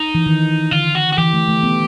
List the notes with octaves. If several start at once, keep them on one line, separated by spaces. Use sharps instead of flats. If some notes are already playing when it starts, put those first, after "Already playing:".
Already playing: D#4
E3
D#3
D3 F4
F#4
F#4
E3 G4
A3
A3
B3